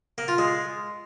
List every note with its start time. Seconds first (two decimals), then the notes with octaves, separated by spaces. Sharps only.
0.18 A#3
0.28 F4
0.38 G#3